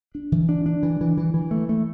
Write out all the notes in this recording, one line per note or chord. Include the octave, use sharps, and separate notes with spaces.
D4
E3
D4
D4
E3
E3
E3
E3
A3
A3